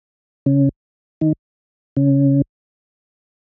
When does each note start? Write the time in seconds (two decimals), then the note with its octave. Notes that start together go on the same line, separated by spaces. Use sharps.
0.46 C#3 C#4
1.21 D#3 D#4
1.97 C#3 C#4